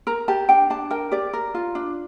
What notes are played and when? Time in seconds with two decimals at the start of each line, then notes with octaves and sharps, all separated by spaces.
0.07 A#4 A#5
0.28 G4 A5
0.49 D4 G5
0.70 D4 A5
0.90 A#4 G5
1.11 G4 D5
1.33 A#4
1.54 F4
1.75 D4